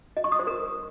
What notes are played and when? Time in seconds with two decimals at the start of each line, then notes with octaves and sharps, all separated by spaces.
0.17 D#5
0.24 C#6
0.32 D#6
0.39 C5
0.47 A#4